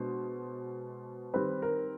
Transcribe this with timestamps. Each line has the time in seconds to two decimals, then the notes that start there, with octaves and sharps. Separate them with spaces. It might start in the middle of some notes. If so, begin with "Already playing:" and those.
Already playing: B2 G#3 B3 D4 C5
1.34 D#3 G3 C4 B4
1.62 A#4